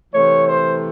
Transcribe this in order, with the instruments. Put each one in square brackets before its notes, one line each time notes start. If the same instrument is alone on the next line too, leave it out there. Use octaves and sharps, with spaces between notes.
[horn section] C3 E3 A3 C#5
C5